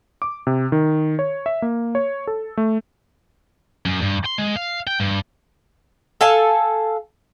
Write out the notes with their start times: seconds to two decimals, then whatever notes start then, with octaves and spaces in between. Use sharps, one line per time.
0.22 D6
0.47 C3
0.72 D#3
1.19 C#5
1.46 E5
1.62 A#3
1.95 C#5
2.27 A4
2.57 A3
3.86 F#2
4.01 G2
4.26 C6
4.38 G#3
4.56 F5
4.87 G5
5.00 G2
6.21 A4 F5 G#5 A5